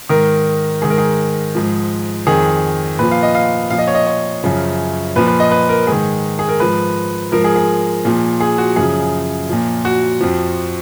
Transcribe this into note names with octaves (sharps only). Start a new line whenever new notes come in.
G#2 D#3 A#4
G#2 D#3 G#4
A#4
G#4
G#2 F3
F2 D#3 G#4
A#2 F3 B4
F5
D#5
F5
A#2 F3 F5
D#5
C#5
D#5
C#5
F#2 C#3 F3
A#2 F3 B4
B4
D#5
B4
A#4
G#2 D#3 G#4
G#4
A#4
G#2 F3 B4
G#2 F3 A#4
G#4
G#4
A#2 F3
G#4
F#4
F#2 C#3 F3 G#4
A#2 F3
F#4
F2 F3